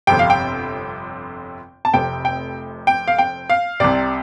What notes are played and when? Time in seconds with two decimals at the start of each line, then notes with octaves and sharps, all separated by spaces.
0.07 G1 F2 C3 G5
0.19 F5
0.30 G5
1.85 A5
1.94 F1 F2 C3 G5
2.25 G5
2.87 G5
3.08 F5
3.18 G5
3.50 F5
3.80 C2 C3 D5